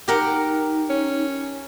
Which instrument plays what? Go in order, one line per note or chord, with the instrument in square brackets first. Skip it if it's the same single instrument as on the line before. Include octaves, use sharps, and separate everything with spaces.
[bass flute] D#4 [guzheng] G4 A#4 F#5
[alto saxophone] C#4